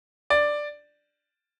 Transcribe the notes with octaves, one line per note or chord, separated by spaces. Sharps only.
D5